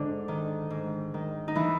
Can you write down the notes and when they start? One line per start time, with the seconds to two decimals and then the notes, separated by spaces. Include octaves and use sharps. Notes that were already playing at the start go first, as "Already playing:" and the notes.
Already playing: G#2 D3 D4
0.28 D#3
0.70 G#2
1.14 D#3
1.48 D#4
1.55 E3 E4